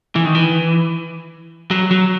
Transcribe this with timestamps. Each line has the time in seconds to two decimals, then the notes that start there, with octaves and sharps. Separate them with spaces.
0.16 E3
0.25 D#3
0.35 E3
1.71 F#3
1.91 F#3